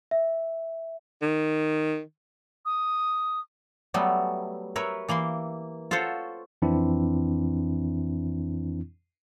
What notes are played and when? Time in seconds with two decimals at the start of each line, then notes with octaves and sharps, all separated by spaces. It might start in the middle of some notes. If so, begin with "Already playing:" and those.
0.11 E5
1.22 D#3
2.65 D#6
3.94 F#3 G3 A3 B3
4.76 A#4 B4 C#5 E5
5.08 E3 A#3 B5 C6
5.91 F4 F#4 A4 C5 C#5
6.62 F2 E3 C4 D4 E4